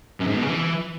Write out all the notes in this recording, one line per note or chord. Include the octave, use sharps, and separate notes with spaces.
F#2
G#2
B2
C#3
E3